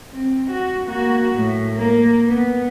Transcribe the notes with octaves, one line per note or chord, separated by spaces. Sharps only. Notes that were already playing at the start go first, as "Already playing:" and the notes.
C4
F#4
A#3 F#4
A2
A#3
B3